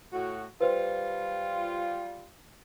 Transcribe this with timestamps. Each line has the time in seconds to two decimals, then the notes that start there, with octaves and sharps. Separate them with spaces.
0.13 A2 F#4
0.61 G3 F4 B4 C5